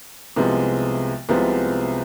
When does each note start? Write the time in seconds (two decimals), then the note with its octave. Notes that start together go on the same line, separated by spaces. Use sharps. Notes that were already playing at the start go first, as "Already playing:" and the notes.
0.36 C2 C3 F3 G#3 B3
1.29 C2 C3 F3 G#3 B3